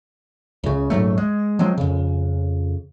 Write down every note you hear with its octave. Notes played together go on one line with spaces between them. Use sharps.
C#2 C#3
D#1 G#2 F#3 A3
G#3
F3 F#3 G#3 C4
F2 C#3